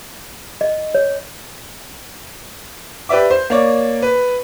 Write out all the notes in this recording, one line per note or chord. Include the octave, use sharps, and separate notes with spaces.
D#5
C#5
G4 B4 D5 E5 D6
C5
A#3 C#5 D5
B4